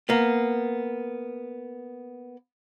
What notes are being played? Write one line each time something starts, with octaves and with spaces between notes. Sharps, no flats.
A#3 B3